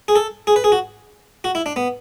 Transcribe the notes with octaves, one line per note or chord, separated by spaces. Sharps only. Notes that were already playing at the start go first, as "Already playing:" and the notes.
G#4
A4
G#4
B4
G#4
F#4
F#4
E4
D4
B3